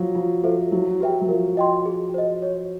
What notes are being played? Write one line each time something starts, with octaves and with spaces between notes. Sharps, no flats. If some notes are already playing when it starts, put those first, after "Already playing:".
Already playing: F3 F#3
F3 F4
F3 A4 C5 E5
F#3 E4
G4 B4 E5 G5
F#3
F3 A#4
D#5 G5 C6
G#4
C5 D#5
C#5